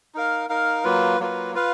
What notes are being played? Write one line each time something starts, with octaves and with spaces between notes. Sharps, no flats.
D#4 A#4 F5
D#4 A#4 F5
F#3 A#3 F4 B4
F#3 A#3 F4 B4
F4 B4 F5